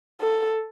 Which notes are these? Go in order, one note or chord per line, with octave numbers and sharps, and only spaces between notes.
A4